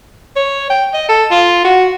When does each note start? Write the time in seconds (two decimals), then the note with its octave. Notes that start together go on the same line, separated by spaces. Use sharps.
0.36 C#5
0.70 G5
0.94 D#5
1.09 A4
1.31 F4
1.65 F#4